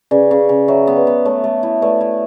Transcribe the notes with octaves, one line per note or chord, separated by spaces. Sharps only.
C#3 B4 D5
C#3
C#3
F#3 C#5 E5
B3
B4 D5
B3
A3 C#5
A3
E4
A3 B4 D5
E4